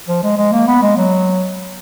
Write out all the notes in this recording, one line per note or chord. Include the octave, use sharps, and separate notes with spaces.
F3
G#3
G#3
A#3
B3
G#3
F#3